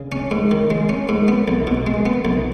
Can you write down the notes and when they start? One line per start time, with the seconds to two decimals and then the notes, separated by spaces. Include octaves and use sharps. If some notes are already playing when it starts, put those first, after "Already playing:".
Already playing: C#3
0.12 C#4
0.31 G#2
0.51 D#3
0.70 G#3
0.89 C#4
1.09 G#2
1.28 B3
1.48 B1
1.67 B2
1.87 G#3
2.06 B3
2.25 B1